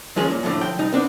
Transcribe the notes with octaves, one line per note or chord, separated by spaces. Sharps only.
D#2 F3 G#3 C#4 G#4
A#2
F2 A2 D3 A3
F3 G5
C2 D#4
B3 C4 D4